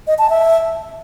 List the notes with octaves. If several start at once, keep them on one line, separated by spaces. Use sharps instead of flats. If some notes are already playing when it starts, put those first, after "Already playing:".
D#5
A5
E5